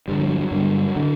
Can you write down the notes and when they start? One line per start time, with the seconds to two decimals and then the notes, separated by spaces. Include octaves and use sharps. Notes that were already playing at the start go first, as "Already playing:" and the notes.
0.08 G2 D3 G3
0.19 F#3
0.29 F#3
0.40 F#3
0.51 G2 D3
0.96 D3